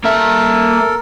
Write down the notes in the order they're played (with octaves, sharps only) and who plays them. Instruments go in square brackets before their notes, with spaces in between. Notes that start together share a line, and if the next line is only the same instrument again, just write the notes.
[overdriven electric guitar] A#3 E5 [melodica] A4 A#4